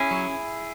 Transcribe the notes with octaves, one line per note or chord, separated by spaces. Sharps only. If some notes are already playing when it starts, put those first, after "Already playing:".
Already playing: C#4 E4 G#4
F#3